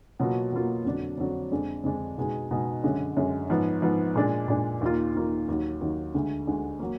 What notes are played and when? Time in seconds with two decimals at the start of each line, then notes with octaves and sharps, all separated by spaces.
0.19 B2 F#3 A#3 F4
0.52 B2 F#3 A#3 F4
0.85 F2 D3 F#3 D4
1.18 F2 D3 F#3 D4
1.52 F2 D3 G#3 D4
1.84 F2 D3 G#3 D4
2.18 B2 G#3 D#4 G#4
2.51 B2 G#3 D#4 G#4
2.83 F#2 D3 G#3
3.17 F#2 D3 G#3
3.50 G#2 F3 B3
3.82 G#2 F3 B3
4.15 A#2 G#3 D4
4.48 A#2 G#3 D4
4.81 D#2 D#3 A#3 F4
5.15 D#2 D#3 A#3 F4
5.48 D#2 D#3 F#3
5.81 D#2 D#3 F#3
6.14 D2 D3 G#3
6.47 D2 D3 G#3
6.80 F#3 A#3